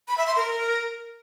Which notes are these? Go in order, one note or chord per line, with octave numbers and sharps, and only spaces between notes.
B5
E5
C6
A#4